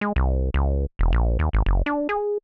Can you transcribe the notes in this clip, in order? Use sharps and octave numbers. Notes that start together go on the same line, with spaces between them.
G#3
C2
C#2
E1
A#1
D#2
G#1
F#1
D4
G#4